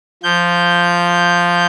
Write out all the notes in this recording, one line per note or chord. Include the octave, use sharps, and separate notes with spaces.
F3 G6